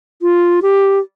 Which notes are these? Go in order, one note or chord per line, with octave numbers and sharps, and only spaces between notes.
F4
G4